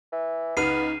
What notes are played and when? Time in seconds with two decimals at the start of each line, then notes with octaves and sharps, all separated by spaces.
0.12 E3
0.57 C#2 B3 D#4 B4 F6 C7 D#7